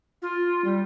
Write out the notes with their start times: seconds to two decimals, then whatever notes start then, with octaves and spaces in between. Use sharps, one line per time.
0.22 F4
0.65 G3